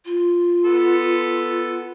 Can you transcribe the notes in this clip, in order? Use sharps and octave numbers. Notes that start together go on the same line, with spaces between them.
F4
B3 A4